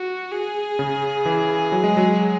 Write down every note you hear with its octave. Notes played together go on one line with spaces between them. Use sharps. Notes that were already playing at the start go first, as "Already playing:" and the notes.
Already playing: F#4
G#4
C#3
E3
F#3
G#3
F#3